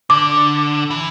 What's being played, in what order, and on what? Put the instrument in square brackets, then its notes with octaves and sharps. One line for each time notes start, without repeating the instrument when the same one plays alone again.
[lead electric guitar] D3 [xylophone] D6
[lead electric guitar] E3